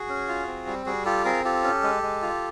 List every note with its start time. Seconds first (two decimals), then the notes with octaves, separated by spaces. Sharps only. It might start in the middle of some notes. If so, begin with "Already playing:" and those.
Already playing: F#4 G#4
0.09 C#4
0.28 F4
0.47 C4
0.67 G3
0.86 G3 F#4 G#4
1.05 F4 G4 A4
1.25 C4 G#4 A#4
1.44 F4 G4 A4
1.64 C#4
1.83 G#3
2.03 G#3
2.22 F4